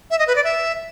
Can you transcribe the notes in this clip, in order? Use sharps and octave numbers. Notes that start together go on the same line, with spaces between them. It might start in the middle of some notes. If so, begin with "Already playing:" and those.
E5
D#5
B4
D5
E5